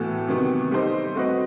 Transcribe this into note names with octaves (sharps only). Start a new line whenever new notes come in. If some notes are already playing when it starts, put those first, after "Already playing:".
Already playing: A2 E3 B3 F#4 A4
C3 D#3 F#3 B3
G3 D#4 A4 C5 D#5
A3 C4 F#4 B4 D#5